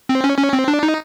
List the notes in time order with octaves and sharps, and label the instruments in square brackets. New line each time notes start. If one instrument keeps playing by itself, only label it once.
[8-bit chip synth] C4
C#4
C#4
C4
D4
D#4